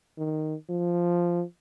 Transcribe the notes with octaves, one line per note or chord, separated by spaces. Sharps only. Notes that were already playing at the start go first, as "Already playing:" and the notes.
D#3
F3